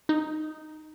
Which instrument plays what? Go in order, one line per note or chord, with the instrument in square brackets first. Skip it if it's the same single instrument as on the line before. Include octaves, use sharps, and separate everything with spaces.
[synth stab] D#4